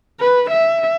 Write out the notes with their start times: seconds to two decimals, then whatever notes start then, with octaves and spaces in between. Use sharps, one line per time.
0.21 B4
0.51 E5